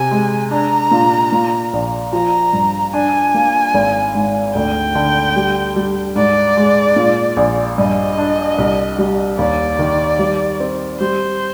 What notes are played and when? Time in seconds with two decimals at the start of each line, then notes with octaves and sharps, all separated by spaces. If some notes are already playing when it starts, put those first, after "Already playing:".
Already playing: C3 G#5
0.11 G#3
0.51 D4 A#5
0.91 A#2
1.32 A#2
1.73 A#1
2.13 F3 A#5
2.53 G2
2.94 D4 G#5
3.34 A#3
3.74 G#1
4.15 G#2
4.55 D2 G5
4.95 D3
5.36 G3
5.76 G3
6.16 G#2 D5
6.57 G#3
6.96 A#2
7.37 A#1
7.78 G2 D#5
8.18 D4
8.58 C2
8.98 G3
9.39 D#2 D5
9.79 D#3
10.19 G3
10.60 C4
11.00 G3 C5